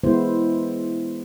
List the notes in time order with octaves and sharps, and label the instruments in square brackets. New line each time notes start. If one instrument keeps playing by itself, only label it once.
[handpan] E3 G#3 B3 E4 C5